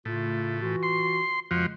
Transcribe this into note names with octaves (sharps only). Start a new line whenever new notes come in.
A2 C#3 A3 F4
E3 F4 F#4
C6
F2 C#3 F3 G#3 F#4